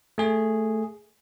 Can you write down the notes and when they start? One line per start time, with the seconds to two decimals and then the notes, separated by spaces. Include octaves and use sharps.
0.18 A3 G#4